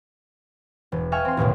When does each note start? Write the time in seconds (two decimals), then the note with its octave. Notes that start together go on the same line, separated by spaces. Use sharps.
0.92 E1
1.12 E5 F5 G5 G#5 C#6 F6
1.25 C4 C6
1.37 A1 D#2 B2 D#3